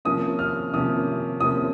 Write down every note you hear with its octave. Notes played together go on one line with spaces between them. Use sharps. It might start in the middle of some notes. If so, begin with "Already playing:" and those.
C3 F3 A#3 C#4 D#6
F6
C3 F3 A#3 C#4 D#6
C3 F3 A#3 C#4 D#6